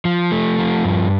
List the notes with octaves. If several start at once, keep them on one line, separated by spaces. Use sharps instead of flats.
F3
A3
F3
G2